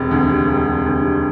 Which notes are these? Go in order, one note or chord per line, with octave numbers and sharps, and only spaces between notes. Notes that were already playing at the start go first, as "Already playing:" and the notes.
Already playing: E1 C3
D2
G3
E1
C3
D2
G3